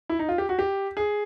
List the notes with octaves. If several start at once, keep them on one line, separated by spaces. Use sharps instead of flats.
E4
D#4
F4
G4
F#4
G4
G#4